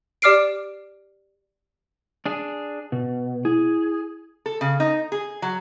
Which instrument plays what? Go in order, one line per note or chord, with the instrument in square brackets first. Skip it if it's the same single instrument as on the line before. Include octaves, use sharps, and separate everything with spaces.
[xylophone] G4 D5 D6 F6 C7 D7
[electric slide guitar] D4 G#4
B2
[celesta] E4 [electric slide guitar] G#4
[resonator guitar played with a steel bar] A4
C#3
D#4
G#4
F#3